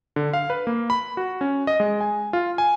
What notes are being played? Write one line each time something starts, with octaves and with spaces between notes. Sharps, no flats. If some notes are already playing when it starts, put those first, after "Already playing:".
D3
F5
B4
A#3
B5
F#4
C#4
D#5
G#3
G#5
F4
G#5